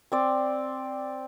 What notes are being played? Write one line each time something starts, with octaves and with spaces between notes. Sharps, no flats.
C4 D5